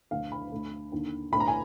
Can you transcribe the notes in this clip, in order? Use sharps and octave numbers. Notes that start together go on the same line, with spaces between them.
D2 D3 F5
B5
D2 D3
D#2 D3
D2 D3 B5
A#5
G#5